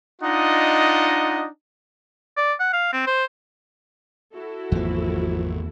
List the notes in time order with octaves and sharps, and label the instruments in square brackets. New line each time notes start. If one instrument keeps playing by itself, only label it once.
[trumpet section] D4 D#4 F4 D#5 F#5
[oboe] D5
F#5
F5
C4
C5
[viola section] E4 F#4 A4
[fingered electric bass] G#1 [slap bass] E2 A#3 [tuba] F3